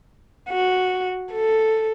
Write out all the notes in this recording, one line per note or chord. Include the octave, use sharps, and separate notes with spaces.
F#4
A4